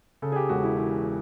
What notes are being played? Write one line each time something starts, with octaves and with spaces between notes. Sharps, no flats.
C#3 A4
G#4
G4
E1 F#4
E4
E3 E4